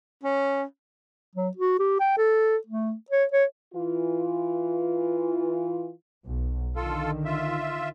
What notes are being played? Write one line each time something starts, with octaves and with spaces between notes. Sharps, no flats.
C#4
F#3
F#4
G4
G5
A4
A3
C#5
C#5
E3 F4
B1
D3 D#3 F4 A4
F4 E5